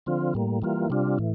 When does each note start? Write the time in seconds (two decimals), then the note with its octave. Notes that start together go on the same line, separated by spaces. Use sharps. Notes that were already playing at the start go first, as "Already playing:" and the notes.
0.06 D3 F3 C4 F4
0.34 A2 G3 A#3
0.62 E3 G3 A#3 F4
0.90 C3 G3 D4 F4
1.18 A2 E3